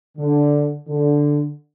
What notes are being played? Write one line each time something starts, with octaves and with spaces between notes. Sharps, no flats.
D3
D3